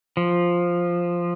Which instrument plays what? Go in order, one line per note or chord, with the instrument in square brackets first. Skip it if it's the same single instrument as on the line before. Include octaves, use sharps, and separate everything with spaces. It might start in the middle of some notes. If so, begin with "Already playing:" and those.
[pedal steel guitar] F3